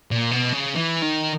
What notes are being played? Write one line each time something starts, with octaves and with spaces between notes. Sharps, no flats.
A#2
B2
C#3
E3
D#3